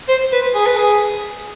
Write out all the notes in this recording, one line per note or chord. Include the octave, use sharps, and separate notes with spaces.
C5
B4
G#4
B4
G#4